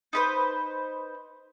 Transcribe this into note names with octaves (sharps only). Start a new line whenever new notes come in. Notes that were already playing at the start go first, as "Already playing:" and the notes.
D#4 B4 C5